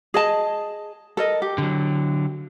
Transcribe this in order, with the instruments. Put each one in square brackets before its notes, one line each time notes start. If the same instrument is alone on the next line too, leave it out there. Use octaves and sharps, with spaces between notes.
[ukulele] G#4 D#5 A5
A4 A#4 D#5
G4
[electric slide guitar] D3 F#3